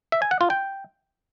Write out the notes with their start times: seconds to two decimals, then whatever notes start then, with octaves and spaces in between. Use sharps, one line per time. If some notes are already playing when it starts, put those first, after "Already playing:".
0.12 E5
0.22 G#5
0.31 F#5
0.41 F4
0.50 G5